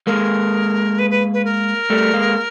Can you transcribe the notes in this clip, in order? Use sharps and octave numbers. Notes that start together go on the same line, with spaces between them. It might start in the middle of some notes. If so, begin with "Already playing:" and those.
G#3 A#3 A#4
B4
B4
B4
A#4
G3 A3
G#3 A#3